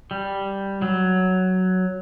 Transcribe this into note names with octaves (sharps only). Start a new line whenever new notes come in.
G3
F#3